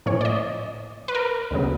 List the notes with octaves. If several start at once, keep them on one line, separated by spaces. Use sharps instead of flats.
A2 F3 A#3 C#4 C#5
D5
D#5
B4
A#4
D2 C#3 F#3 B3